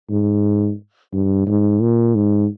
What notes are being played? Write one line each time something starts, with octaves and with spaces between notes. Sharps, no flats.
G#2
G2
G#2
A#2
G#2